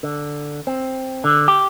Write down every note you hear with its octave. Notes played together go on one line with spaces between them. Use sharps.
D3
C4
D3
G4